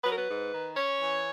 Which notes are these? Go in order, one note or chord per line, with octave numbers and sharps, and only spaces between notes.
F#3 B4
A#4
B4
G#2
D#3
C#4 C#5
E3